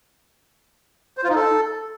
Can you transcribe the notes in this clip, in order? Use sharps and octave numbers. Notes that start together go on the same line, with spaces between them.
C5
F4
D#4
A4